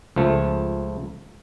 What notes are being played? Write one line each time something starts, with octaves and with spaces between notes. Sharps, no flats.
C#2 F3 A3